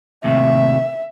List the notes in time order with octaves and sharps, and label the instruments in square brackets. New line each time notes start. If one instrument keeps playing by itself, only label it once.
[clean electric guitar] D#2 A2 C3 [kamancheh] E5